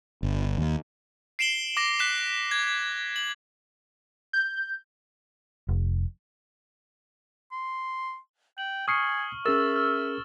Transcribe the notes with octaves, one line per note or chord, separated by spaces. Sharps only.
G1
D#2
C7 D7 E7 F#7 G7
D6 A#6 E7
F#6 B6 E7
G#6
F#7
G6
F1
C6
G5 F#7
G#5 C#6 D#6 F6 C7 C#7
C#4 G#4 A#4 E5 E6 A6 E7
F6